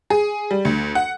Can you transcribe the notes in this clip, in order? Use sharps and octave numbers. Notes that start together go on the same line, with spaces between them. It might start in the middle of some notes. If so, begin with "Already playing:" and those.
G#4
G3
D2
F#5